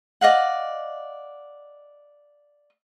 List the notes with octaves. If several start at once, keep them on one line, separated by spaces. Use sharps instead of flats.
D5 D#5 F5 F#5